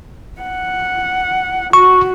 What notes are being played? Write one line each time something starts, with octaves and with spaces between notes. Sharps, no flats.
F#5
F#4 C#6